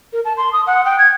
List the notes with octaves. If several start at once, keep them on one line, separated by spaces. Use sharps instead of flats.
A#4
A5
C6
D#6
F#5
G5
G#6